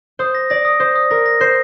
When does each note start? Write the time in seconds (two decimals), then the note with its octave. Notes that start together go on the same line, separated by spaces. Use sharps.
0.19 C5 D#6
0.35 A#6
0.50 D5 A#6
0.65 D#6
0.80 C5 D#6
0.96 D#6
1.11 A#4 A#6
1.26 A#6
1.41 C5 C7